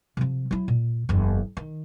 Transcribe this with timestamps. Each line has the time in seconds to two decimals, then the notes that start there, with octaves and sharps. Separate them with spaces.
0.17 C3 F3
0.51 F#3 E4
0.68 A#2
1.09 F#1 E2
1.57 D#3